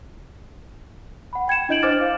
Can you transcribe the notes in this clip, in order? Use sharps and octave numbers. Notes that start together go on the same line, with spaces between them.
F#5 B5
G5 G#6 C#7 E7
D4 E4 D#5 G6 D7 F#7
C5 G#5 D6 F6 A6
F5